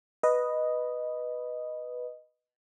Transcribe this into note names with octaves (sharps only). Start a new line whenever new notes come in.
B4 D#5